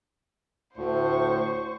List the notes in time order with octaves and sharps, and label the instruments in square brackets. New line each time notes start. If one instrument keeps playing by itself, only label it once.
[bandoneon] D2 [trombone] A2 [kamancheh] C5 C#6